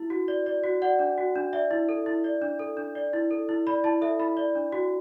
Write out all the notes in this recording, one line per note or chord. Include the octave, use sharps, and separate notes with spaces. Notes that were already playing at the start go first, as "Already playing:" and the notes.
Already playing: E4
F#4
D5
D5
F#4
D5 F#5
D4
F#4
D4
D5 E5
E4
A4
E4
D5
D4
A4
D4
D5
E4
A4
E4
D5 B5
E4 A5
A4 E5
E4 B5
D5
D4
F#4